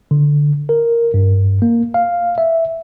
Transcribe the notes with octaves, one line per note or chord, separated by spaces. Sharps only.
D3
A#4
G2
A#3
F5
E5